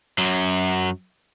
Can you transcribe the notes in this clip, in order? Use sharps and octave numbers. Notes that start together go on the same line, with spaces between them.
F#2 F#3